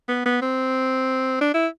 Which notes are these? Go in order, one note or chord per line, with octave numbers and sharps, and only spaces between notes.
B3
B3
C4
D4
E4